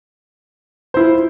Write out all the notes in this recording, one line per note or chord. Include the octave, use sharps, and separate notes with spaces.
E4 F4 C5